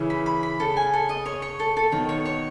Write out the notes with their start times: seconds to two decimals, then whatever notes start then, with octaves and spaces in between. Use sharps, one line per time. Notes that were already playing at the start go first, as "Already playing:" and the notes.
Already playing: C#3 E3
0.10 B5
0.26 B5
0.43 B5
0.60 C#3 A4
0.77 G#5
0.94 A4
1.09 D#5
1.26 C#5
1.42 C#5
1.60 A4
1.77 A4
1.92 B2 D#3 C#5
2.09 C#5
2.25 C#5